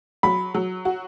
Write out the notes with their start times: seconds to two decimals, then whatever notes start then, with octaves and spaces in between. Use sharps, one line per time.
0.23 F#3 B5
0.54 F#3
0.85 F#4